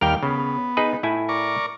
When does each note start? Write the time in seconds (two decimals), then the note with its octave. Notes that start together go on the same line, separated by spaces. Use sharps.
0.01 D#2 G3 A#4 F5 G5 F6
0.23 C#3 B3
0.77 D#4 G#4 B4
1.03 A2 E4 G#5
1.29 A#4 D5 C#6